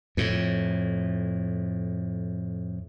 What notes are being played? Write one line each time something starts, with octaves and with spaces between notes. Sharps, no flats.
F2 A2